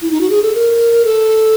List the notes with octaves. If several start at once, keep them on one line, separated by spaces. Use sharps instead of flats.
E4
D#4
F#4
G#4
A4
A#4
A4